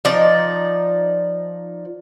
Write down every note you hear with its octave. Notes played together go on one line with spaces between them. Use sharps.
F3 D#4 D5